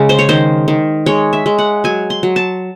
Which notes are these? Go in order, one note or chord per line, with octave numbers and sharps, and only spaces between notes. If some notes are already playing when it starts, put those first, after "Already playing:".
Already playing: C#3 G#3
C5
C#5
D#3 C5
D#3
G#3 C#5
E5
G#3
F#5
F#3 G#5
C6
F#3
A5